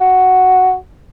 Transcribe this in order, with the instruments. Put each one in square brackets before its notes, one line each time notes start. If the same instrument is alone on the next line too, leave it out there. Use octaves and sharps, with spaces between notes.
[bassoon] F#4